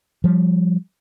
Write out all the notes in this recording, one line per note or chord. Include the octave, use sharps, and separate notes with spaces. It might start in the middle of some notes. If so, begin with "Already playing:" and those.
F3 G3